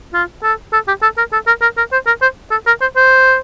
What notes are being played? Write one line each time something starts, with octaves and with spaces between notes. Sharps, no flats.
F4
A4
A4
G4
A4
A#4
A4
A#4
A#4
A#4
C5
A#4
C5
A4
A#4
C5
C5